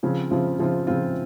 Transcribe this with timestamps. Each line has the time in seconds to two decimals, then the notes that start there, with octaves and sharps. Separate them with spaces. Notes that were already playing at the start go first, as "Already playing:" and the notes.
0.03 C#3 F3 C4 F4
0.31 C#3 F3 C4 F4
0.59 C#3 F3 C4 F4
0.87 C#3 F3 C4 F4